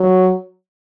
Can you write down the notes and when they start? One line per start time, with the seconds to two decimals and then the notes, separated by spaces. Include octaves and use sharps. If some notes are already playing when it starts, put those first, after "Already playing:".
Already playing: F#3